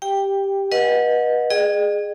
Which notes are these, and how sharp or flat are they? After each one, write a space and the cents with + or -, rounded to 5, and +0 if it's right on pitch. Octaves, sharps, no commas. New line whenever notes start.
G4 +0 G5 +5
B4 -30 D#5 +0 F#5 -25
G#4 +0 D#5 -45 G5 -15